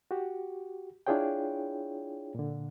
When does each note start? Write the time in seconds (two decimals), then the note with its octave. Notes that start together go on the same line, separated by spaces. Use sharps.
0.11 F#4 G4
1.07 D4 E4 F4 G#4 C#5 G5
2.35 A#2 D3